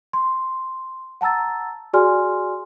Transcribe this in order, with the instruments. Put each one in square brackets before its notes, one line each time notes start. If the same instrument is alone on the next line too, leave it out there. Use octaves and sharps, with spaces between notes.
[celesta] C6
F#5 A5 A#5 E6 A6
F#4 G#4 D5 G#5 C6 F6